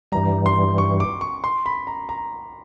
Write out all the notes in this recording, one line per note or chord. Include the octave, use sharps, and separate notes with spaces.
G2 E3 G3 A#5
C6
C#6
D6
C#6
C6
B5
A#5
A#5